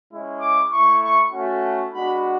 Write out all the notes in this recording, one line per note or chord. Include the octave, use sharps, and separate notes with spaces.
G#3 C#4 E4
D6
A3 E4 C#6
C#6
A3 C#4 F#4
A5
G#3 B3 D4 F#4 B5